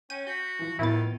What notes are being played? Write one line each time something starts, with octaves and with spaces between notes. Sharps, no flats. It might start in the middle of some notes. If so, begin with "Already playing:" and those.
C#4 G5 D#7
F#4 G6 B6
E3 F3
A2 D#3 F3 B3 E4 A6